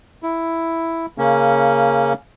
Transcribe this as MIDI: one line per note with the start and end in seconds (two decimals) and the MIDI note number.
0.23 1.06 64
1.18 2.13 49
1.18 2.13 58
1.18 2.13 61